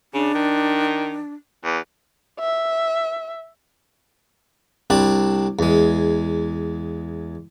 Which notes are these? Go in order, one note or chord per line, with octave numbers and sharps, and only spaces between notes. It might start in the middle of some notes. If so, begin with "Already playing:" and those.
C#3 D4
D#3
E2
E5
C2 C4 D4 B5
E2 G#3